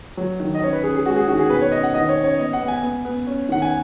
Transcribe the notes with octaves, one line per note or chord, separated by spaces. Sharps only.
F#3
D#3
D#5
C#4 C#5
B4
C#4 G#4
G#4
G#3 F#4
G#4
D#3 F#4
G#4
B2 B4
C#5
C#4 D#5
F#5
D#3 D#5
C#5
C#4
C#5
B3 D#5
F#5
B3
G#5
B3
B3
C#4
D#3 F#5
G#5